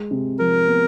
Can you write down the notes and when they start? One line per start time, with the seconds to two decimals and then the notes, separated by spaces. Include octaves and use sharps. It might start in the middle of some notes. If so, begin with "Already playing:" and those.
Already playing: G#3
0.11 C3
0.39 F3 A#4
0.68 B3